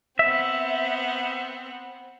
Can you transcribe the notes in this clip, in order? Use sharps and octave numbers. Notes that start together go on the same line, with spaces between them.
B3 C4 E5